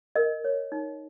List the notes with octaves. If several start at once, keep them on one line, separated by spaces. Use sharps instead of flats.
A#4 D#5
C#5
D#4